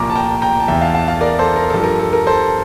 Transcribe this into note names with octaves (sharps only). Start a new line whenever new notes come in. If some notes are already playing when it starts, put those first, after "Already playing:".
Already playing: C2 A#2 F3 A#5 D6
A5
G5 A#5
G5 A#5
A5
E2 E3 E5 G5
F5 A5
F5 A5
F5 A5
A#4 D5
A4 C5
A#4
G2 F3 A4
A#4
A4
A#4
A4 C5